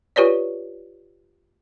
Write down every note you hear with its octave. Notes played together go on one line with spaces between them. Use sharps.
F4 G4 B4 C#5 D5